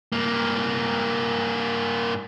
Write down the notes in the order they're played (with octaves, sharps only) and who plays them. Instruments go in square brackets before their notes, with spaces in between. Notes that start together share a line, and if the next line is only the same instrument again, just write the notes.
[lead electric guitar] G2 A#3